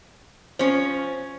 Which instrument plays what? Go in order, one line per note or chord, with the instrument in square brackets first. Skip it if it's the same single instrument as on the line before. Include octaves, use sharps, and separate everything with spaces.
[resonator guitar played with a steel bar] F3 C#4 [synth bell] C5